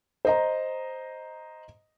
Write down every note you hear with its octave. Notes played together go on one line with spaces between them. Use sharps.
C5 D#5 A#5